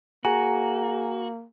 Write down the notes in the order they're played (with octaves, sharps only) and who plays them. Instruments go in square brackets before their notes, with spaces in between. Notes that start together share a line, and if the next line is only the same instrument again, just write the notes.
[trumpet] A#3 [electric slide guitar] F#4 [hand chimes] G#4 A#5 [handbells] G#5